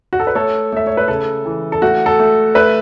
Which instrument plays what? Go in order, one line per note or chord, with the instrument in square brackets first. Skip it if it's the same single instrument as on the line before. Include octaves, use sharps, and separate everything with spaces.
[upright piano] F#4
A4
B4
A3 A4 C#5
A3 E5
C#5
B4
C#3 A4
E3
A4
A3 F#4
A4
A3
A3 B4 E5